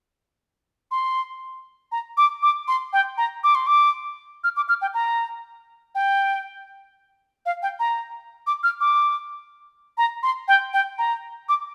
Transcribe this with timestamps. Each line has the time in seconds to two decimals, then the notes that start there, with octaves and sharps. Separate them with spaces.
0.91 C6
1.92 A#5
2.17 D6
2.43 D6
2.68 C6
2.93 G5
3.18 A#5
3.44 D6
3.55 C6
3.67 D6
4.44 F6
4.56 D6
4.69 F6
4.82 G5
4.94 A#5
5.95 G5
7.46 F5
7.63 G5
7.80 A#5
8.47 D6
8.63 F6
8.80 D6
9.98 A#5
10.23 C6
10.48 G5
10.73 G5
10.98 A#5
11.49 D6